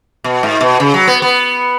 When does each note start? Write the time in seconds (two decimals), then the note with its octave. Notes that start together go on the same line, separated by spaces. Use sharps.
0.24 B2
0.43 G#2
0.61 B2
0.80 C#3
0.94 F#3
1.07 B3
1.22 B3